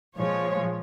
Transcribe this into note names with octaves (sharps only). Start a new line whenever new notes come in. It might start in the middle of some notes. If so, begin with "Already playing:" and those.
A#2 F3 G#3 C#5